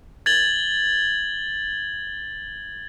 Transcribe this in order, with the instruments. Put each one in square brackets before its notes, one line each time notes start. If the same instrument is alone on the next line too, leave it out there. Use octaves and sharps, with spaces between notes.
[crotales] G#6 A6 F#7 G7